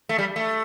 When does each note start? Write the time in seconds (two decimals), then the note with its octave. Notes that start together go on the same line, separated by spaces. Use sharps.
0.09 A3
0.18 G3
0.36 A3